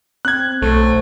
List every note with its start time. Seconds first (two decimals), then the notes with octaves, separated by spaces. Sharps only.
0.25 C4 F#6 G#6
0.62 B1 A3 C5